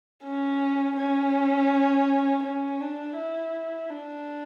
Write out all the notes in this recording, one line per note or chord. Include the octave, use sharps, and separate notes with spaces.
C#4
C#4
C#4
D4
E4
D4